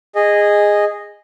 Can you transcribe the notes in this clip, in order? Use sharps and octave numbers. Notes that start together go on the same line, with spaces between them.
G#4 D#5